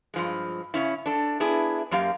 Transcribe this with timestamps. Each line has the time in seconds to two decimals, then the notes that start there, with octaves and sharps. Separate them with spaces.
0.14 G2 F3 G#3
0.74 C#3 C#4 E4
1.06 D4 A4
1.40 B3 D4 E4 G#4
1.91 F#2 F#3 A#3 G4 F5